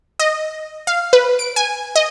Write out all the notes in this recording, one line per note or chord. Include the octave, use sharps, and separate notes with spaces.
D#5
F5
B4
D7
G#5
D#5